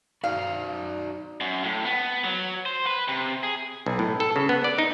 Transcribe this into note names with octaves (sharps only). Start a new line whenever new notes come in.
D#4 F#4 D5 F5
F#2
A2
B3
F#3
C5
B4
C3
G#4
B1
A2
A4
C#3
B3
D5
D#4